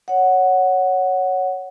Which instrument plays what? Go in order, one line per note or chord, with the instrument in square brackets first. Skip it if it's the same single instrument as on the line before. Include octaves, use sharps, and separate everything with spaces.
[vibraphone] C#5 F#5